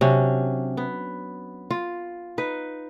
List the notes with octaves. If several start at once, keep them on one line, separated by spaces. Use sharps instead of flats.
C3 F#3 C#4 D4
B3
F4
D#4 B4